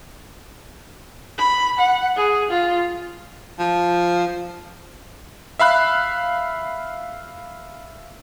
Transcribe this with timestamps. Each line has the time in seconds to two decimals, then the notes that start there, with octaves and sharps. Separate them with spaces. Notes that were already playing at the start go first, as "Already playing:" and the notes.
1.38 B5
1.79 F#5
2.16 G#4
2.51 F4
3.59 F3
5.59 E5 F5 B5 F#6